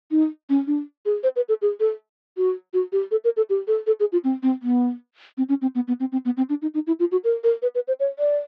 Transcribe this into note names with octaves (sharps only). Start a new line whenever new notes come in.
D#4
C#4
D4
G#4
C5
B4
A4
G#4
A4
F#4
F#4
G4
A4
A#4
A4
G4
A4
A4
G#4
F4
C4
C4
B3
C4
C#4
C4
B3
B3
C4
C4
B3
C4
D4
D#4
D#4
E4
F4
F#4
A#4
A#4
B4
B4
C5
C#5
D5